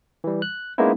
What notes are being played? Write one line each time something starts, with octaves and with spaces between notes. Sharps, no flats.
E3 G3
F#6
G#3 A#3 B3 C#4 D#4 E4